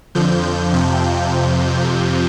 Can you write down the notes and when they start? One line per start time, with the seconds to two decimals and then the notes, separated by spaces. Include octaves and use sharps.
0.15 F2 D3 F3 G6
0.72 F2 C3 F3